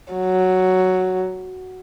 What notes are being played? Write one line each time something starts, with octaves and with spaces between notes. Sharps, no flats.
F#3